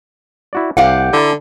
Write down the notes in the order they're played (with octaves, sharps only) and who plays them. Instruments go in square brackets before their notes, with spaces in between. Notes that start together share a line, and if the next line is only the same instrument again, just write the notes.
[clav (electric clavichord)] E4 F#4 D5
[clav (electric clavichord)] C2 [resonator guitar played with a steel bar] G4 F5 F#5
[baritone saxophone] D3 [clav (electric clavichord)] E4 A5 A#5